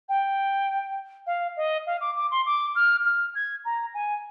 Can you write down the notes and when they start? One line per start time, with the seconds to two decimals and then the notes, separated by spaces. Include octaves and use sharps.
0.09 G5
1.27 F5
1.57 D#5
1.86 F5
2.01 D6
2.16 D6
2.31 C6
2.46 D6
2.76 F6
3.05 F6
3.35 G#6
3.65 A#5
3.94 G#5